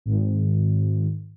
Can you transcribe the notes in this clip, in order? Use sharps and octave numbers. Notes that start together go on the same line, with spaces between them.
G#1